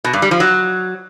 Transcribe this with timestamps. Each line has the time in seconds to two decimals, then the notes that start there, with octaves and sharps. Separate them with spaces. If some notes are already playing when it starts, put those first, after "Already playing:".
0.04 B2
0.13 G2
0.22 G3
0.31 F3
0.40 F#3